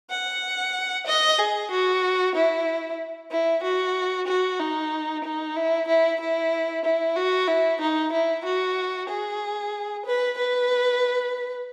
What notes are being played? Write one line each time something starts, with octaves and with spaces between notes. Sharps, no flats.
F#5
D#5
G#4
F#4
E4
E4
F#4
F#4
D#4
D#4
E4
E4
E4
E4
F#4
E4
D#4
E4
F#4
G#4
B4
B4